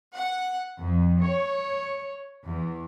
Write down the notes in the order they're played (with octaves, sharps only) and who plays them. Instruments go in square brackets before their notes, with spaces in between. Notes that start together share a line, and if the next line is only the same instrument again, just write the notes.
[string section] F#5
F2
C#5
E2